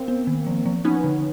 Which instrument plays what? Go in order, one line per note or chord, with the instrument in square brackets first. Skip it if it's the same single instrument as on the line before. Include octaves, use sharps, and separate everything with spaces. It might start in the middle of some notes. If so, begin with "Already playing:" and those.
Already playing: [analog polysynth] A#3 C4
[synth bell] B3
D#3
F3
F3
[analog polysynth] B3 C#4 [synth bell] D#4
[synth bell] D3